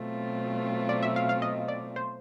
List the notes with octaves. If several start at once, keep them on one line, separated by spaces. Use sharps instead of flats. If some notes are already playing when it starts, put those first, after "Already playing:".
Already playing: B2 F#3 A3 C4 F4
D5
E5
F5
F5
D#5
D5
C5